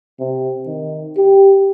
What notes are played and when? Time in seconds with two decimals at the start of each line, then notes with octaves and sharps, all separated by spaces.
0.20 C3
0.66 D#3
1.17 G4